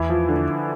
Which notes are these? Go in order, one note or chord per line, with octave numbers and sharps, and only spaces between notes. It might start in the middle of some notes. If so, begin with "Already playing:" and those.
Already playing: E2 E3 E4
F3
D3